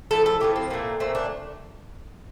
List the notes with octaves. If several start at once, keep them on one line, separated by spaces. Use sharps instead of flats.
A2 F3 A3 A4
A4
A2 F3 A3 G4
C4
A#2 A3 A#3
A#2 A3 C4
D4